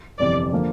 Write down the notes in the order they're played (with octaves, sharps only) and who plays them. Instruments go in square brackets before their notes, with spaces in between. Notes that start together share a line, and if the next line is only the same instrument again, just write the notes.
[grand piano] G1 F2 C3 E3 [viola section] D5
[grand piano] D3 F3 A#3